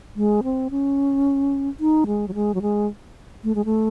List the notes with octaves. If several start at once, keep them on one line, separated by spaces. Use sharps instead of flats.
G#3
C4
C#4
D#4
G#3
F#3
G#3
F#3
G#3
A3
G#3
A3